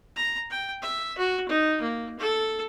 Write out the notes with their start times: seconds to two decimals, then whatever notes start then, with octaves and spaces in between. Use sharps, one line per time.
0.16 A#5
0.50 G5
0.82 E5
1.18 F#4
1.49 D#4
1.81 A#3
2.19 A4